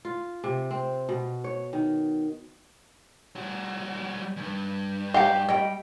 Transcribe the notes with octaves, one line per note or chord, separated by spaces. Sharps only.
F4
C3
C4
B2
C#5
D#3
G3 F#4
E2 G2
G4 D#5 F5 F#5 A#5
G3 D#5 G5